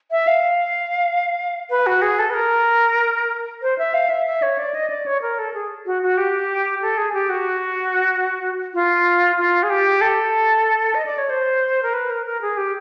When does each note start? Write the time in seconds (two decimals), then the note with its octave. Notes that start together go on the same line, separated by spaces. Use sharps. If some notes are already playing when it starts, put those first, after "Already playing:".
0.11 E5
0.27 F5
1.70 B4
1.86 F#4
2.02 G#4
2.19 A4
2.30 B4
2.34 A#4
3.62 C5
3.78 E5
3.94 F5
4.09 E5
4.26 E5
4.42 C#5
4.58 D5
4.74 D#5
4.90 D5
5.06 C#5
5.22 A#4
5.38 A4
5.54 G#4
5.86 F#4
6.03 F#4
6.17 G4
6.82 A4
6.97 G#4
7.14 G4
7.29 F#4
8.74 F4
9.37 F4
9.63 G#4
9.70 G4
10.01 A4
10.95 D#5
11.06 D5
11.18 C#5
11.29 C5
11.83 A#4
11.93 B4
12.10 A#4
12.26 A#4
12.41 G#4
12.57 G4